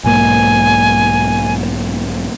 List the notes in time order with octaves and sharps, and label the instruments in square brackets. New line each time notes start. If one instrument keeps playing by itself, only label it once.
[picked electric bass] B1 G#2 A#3 [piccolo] G#5